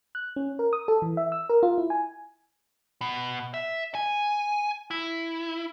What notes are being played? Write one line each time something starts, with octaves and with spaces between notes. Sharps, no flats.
F#6
C#4
A#4
D#6
A4
E3
E5
E6
A#4
F4
E4
G#5
B2
E5
G#5
E4